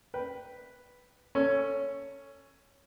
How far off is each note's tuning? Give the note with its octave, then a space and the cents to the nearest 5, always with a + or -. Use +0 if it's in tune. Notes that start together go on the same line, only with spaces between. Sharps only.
B4 +0 G5 -5
C#4 +5 A4 +20 C#6 +0